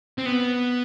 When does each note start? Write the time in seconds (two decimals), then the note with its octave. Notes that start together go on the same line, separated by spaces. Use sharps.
0.18 C4
0.26 B3